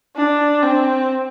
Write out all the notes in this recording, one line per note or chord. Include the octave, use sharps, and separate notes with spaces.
D4
C4